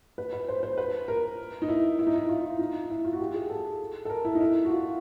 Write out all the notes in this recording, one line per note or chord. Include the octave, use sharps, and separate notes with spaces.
B4
B4
C5
C5
B4
A#4
D#4
E4
E4
D#4
E4
F4
E4
D#4
E4
F4
F#4
G4
G#4
A4
A4
A#4
E4
D#4
E4
F#4
F4